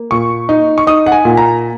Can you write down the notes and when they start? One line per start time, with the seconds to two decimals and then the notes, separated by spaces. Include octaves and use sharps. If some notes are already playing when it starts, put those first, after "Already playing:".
Already playing: A#3
0.11 A#2 C#6
0.49 D#4
0.78 C#6
0.87 D#4 D#6
1.06 F#5
1.12 G#5
1.25 A#2
1.37 A#5